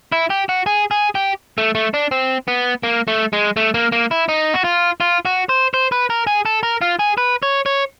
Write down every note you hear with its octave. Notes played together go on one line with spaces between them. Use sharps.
E4
G4
F#4
G#4
G#4
G4
A3
A3
D4
C4
B3
A#3
A3
G#3
A3
A#3
A#3
E4
D#4
F#4
F4
F4
F#4
C5
C5
B4
A#4
G#4
A4
A#4
F4
G#4
B4
C#5
C#5